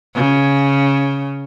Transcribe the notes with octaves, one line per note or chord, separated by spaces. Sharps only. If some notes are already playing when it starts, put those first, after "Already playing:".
C#3